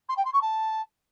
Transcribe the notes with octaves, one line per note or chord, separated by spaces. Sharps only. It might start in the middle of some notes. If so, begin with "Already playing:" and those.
C6
G5
C6
C#6
A5